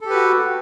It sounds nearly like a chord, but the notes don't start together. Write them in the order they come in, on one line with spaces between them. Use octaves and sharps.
A4 G4 B4 F#4